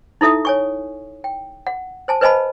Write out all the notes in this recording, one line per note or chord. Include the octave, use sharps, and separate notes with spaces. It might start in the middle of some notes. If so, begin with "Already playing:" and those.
D#4 E4 A4 E5 D#6
C#5 G#5 C#6
G5
F#5
C5 G#5 A5
B4 C5 D#5 G#5 A5 B5